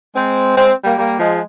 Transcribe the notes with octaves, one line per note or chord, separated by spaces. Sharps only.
G#3 C4
G#3 C4
G3 A#3
G3 A#3
F3 G#3